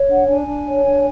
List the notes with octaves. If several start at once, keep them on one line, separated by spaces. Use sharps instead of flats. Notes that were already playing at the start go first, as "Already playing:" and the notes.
Already playing: C#5
D4 F#5
D4 G#5
D4
C#5
D4